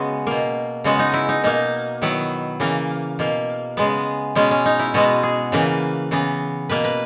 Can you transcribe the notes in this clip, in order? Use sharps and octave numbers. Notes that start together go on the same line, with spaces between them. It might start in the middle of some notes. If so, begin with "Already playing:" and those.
Already playing: C#3 G#3 B3 F#4 G#4
B2 A#3
C#3 G#3 B3 F#4
D#4
E4
D#4
B2 A#3 D#4
D#3 F#3 B3 E4
C#3 E3 A#3
B2 A#3
C#3 G#3 B3
B2 G#3 B3 C#4
C#4
D#4
E4
B2 G#3 B3 F#4
G#4
C#3 E3 A#3 B4
C#3 E3 B3
B2 A#3 B4
B4